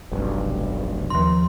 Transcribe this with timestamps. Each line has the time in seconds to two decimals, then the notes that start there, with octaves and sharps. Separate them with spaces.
0.12 F1 B1 G2
1.10 D#2 F3 C6